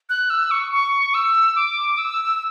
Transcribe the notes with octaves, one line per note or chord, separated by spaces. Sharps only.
F#6
E6
C#6
C#6
E6
D6
E6